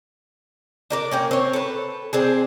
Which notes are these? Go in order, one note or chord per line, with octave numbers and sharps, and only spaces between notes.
D4 A#4 D5
A#3 C#4 G5
C4 C#5
A4 B4
C4 D4 G#4